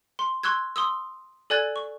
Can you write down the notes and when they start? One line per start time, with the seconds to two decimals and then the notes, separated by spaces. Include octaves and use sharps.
0.19 C6
0.43 C6 C#6 E6 F#6 G#6
0.76 C6 D#6 E6
1.50 A4 D5 G#5 F#6 G#6 A6
1.76 C#6